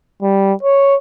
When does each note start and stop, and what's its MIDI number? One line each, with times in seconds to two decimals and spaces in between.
0.22 0.53 55
0.63 0.96 73